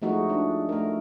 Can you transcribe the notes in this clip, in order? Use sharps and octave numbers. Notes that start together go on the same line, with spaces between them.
F3 G#3 A3 D#4 F#4
D4
A3 A#4